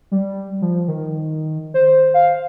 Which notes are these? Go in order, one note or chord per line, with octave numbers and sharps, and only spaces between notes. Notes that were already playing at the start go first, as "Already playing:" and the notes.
G3
F3
D#3
C5
F5